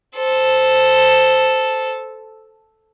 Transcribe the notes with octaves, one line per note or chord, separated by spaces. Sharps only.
A4 C5